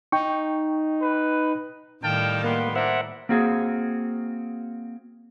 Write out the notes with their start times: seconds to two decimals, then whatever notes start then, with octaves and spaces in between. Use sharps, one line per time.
0.12 D#4 G5 C#6
1.02 B4
2.03 A2 D#3 G3 F5 G5 A5
2.44 A#3 B3 B4 C6
2.76 D4 E4 A#4 C5 E5 F#5
3.29 A#3 C4 F#4 G#4